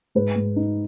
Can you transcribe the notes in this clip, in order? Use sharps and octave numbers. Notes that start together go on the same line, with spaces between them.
G#2 B4
G#2
D#4